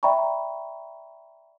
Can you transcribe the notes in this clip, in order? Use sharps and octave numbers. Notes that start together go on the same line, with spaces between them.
D5 E5 G5 A#5 B5 C#6